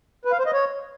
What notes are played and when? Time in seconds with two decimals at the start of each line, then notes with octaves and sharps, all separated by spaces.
0.25 B4
0.32 F5
0.39 C5
0.46 D#5
0.53 C#5